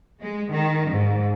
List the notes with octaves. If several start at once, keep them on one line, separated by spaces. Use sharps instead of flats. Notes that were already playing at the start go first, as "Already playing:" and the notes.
G#3
D#3
G#2